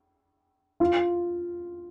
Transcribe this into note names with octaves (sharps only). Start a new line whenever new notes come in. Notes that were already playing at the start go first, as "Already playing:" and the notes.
F4